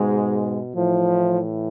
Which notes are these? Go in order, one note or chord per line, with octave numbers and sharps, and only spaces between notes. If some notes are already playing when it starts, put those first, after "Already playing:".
Already playing: G#2 B2 G#3
A2 E3 F3